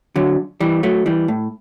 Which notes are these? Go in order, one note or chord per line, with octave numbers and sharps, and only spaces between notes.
D3 F#3
E3 G3
F#3 A3
E3 G3
A2